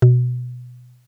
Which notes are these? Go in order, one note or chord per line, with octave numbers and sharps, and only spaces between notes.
B2